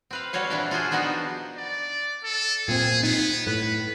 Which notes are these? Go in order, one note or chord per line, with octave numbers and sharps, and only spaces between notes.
C4 B4 F5
G3 F#4 A4 C#5 F5
A#2 E3 F3 D4 E4 F#4
F4 F#4 G#4 C5
F3 B3 D4 D#4 F#4 G4
D5
A4
A#2 C4 G#4
B3 D#4
A2 B4